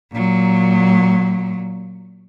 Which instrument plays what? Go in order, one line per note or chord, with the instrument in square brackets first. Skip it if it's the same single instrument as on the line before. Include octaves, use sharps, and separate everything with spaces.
[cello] A#2 F#3